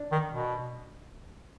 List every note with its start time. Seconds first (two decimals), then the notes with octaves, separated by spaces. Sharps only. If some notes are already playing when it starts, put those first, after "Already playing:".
Already playing: D4
0.12 D#3
0.32 B2